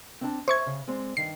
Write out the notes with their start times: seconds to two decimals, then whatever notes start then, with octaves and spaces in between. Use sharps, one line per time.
0.21 C4 D4 A5
0.48 C5 C#5 E5 C#6 G#6
0.66 C#3
0.88 G#3 C4 D5
1.17 G2 D#3 C7